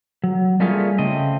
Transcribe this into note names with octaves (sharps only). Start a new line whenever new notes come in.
F#3
G3 A3 A#3 C#4 F4 G#4
C#3 A3 C4 D#5